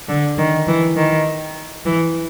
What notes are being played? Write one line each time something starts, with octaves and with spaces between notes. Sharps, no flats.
D3
D#3
E3
D#3
E3